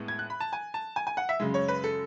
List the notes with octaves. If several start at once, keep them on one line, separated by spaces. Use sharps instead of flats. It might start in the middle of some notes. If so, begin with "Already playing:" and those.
Already playing: A2 G#3 B3
G#6
F#6
B5
A5
G#5
A5
G#5
G#5
F#5
E5
F#2 C#3 G#3
C#5
B4
A4